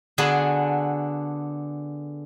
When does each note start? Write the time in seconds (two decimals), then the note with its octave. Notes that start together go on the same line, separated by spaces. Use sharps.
0.18 D3 B3 D4 F#4 G#4 A4